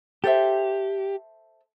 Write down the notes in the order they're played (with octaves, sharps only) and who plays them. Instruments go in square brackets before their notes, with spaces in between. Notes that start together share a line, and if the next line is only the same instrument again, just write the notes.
[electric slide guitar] G4 [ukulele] A4 C5 E5